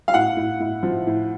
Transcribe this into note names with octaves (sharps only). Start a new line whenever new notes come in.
F5
A2 F#5
A2
A2
F3
A2